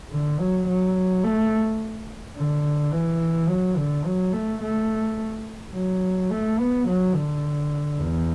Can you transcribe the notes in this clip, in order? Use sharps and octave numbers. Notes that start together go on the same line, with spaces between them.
D3
F#3
F#3
A3
D3
E3
F#3
D3
F#3
A3
A3
F#3
A3
B3
F#3
D3
E2